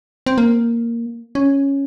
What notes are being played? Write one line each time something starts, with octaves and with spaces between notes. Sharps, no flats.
C4
A#3
C#4